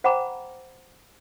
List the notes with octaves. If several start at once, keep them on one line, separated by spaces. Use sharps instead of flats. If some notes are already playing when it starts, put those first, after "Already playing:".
C5 F#5 G5 A#5 B5 D6